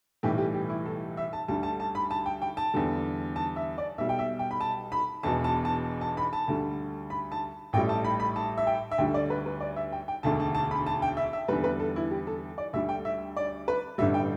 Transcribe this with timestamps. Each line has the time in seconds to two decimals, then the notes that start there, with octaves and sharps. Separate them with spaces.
0.23 B1 A2 E3 G3 G4
0.38 G4
0.54 G4
0.69 E4
0.86 A4
1.17 E5
1.33 A5
1.48 D2 D3 G3 A5
1.63 A5
1.80 A5
1.95 B5
2.11 A5
2.26 G5
2.42 G5
2.57 A5
2.74 E2 D3 G3
3.36 A5
3.56 E5
3.78 D5
3.98 B1 B2 G3 E5
4.09 G5
4.19 E5
4.39 G5
4.51 B5
4.61 A5
4.92 B5
5.23 E1 E2 B2 A5
5.44 A5
5.65 A5
6.01 A5
6.17 B5
6.33 A5
6.48 D2 D3 G3
7.10 B5
7.32 A5
7.73 A1 A2 G3 G5
7.89 A5
8.04 B5
8.20 B5
8.36 A5
8.58 E5
8.67 G5
8.91 E5
8.98 D2 D3 G3 G5
9.14 D5
9.30 B4
9.46 B4
9.61 D5
9.76 E5
9.92 G5
10.08 G5
10.23 E1 D2 D3 A5
10.40 A5
10.55 A5
10.71 B5
10.86 A5
11.02 G5
11.17 E5
11.33 E5
11.48 E2 D3 G3 B4
11.64 B4
11.80 A4
11.96 E4
12.11 G4
12.27 A4
12.58 D5
12.73 D2 D3 G3 E5
12.89 G5
13.05 E5
13.37 D5
13.68 B4
13.98 A1 G2 D3 G3 E5
14.14 G5